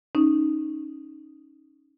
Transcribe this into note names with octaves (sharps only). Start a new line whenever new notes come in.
C#4 D#4